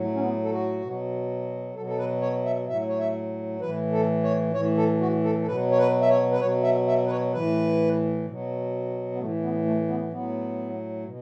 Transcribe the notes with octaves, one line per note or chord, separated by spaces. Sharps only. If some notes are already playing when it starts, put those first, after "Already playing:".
Already playing: A2 F#3
C#4
B3
A4
F#4
B2 F#3
B2 F#3 A4
A4
B4
C#5
E5
A2 F#3 E5
C#5
E5
A2 E3 B4
A4
C#5
A2 E3 C#5
A4
F#4
A4
A4
B2 F#3 B4
C#5
B4
E5
C#5
B4
B2 F#3 C#5
E5
E5
B4
C#5
A2 E3 B4
B2 F#3
B3
A2 E3 A3
B3
A3
B3
A2 F#3 B3
B2